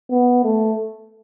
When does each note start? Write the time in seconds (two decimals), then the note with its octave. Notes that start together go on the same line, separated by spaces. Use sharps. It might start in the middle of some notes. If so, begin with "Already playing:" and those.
0.11 B3
0.44 A3